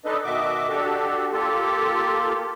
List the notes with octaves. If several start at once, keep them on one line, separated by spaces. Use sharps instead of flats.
G#3 D4 D#4 A4 B4 D#5
B2 D#3 F#4 D#5 E5 D6
D4 F#4 G4 A4
A#3 F4 G4 A4